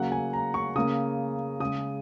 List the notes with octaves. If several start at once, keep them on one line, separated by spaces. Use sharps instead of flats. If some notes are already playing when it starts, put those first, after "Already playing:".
Already playing: C#3 F#3 A#3 F#5
G#5
A#5
C#6
C#3 A#3 D#6
C#3 G#3 D#6